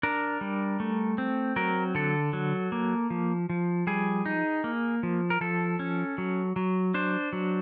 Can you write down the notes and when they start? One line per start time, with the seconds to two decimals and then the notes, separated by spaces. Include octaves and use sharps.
0.03 D4 A#4
0.41 G3
0.80 A3
1.18 C4
1.56 F#3 A#4
1.95 D3 A4
2.33 F#3
2.72 A#3
3.10 F3
3.50 F3
3.87 G3 G#4
4.26 D#4
4.64 A#3
5.03 F3
5.30 A#4
5.41 F3 A4
5.79 C#4
6.18 F#3
6.56 F#3
6.94 D4 C5
7.33 F#3